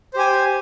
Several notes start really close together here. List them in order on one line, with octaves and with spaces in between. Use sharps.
C5 G4 G#5